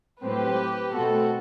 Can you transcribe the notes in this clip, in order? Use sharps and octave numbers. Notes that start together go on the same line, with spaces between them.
A2 F#3 C4 G4 B4
B2 A3 C4 F#4 A4